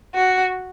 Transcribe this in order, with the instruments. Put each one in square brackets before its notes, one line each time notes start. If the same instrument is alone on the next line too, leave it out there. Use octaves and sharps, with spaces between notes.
[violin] F#4